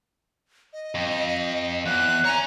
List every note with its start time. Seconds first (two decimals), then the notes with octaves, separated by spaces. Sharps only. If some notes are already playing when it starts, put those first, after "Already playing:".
0.73 D#5
0.95 F2
1.85 E2 F#6
2.25 C#5 G#5 A#5